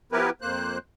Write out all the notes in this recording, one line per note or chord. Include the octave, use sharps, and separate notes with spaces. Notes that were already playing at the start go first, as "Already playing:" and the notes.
F3 B3 E4 G4 A#4 B4
F2 A#3 C5 F#6